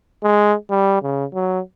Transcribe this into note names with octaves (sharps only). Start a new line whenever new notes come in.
G#3
G3
C#3
F#3